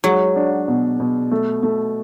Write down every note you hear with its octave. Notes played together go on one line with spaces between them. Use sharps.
F#3 G#3
D4
B2
B2
A3
A3